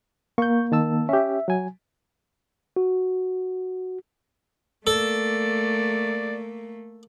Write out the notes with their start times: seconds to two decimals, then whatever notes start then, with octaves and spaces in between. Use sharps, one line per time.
0.38 A#3 C#6 G6
0.72 D#3 A5 E6
1.09 C#4 G4 E5
1.48 F#3 G#5
2.76 F#4
4.87 A3 A#3 A4 D5